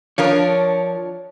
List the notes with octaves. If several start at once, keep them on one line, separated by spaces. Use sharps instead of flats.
F3 D4 A#4 C#5